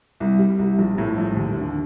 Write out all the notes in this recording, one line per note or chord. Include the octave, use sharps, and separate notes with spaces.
C2
G3
C2
A#1
A2
A#1
D#2
D3